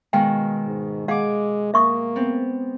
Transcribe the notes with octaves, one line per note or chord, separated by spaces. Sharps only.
B2 D#3 G#3 F5 G5
G#2
G#3 G#4 F5 F#5 D6
A#3 E5 C#6 D#6
B3 C4